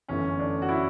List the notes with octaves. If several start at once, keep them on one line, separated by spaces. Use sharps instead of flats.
G1 F#2 E3 A3 C#4
D4
F#4
E4